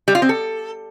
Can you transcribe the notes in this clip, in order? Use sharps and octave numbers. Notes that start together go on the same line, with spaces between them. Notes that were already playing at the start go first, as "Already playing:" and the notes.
G3
F4
C4
A4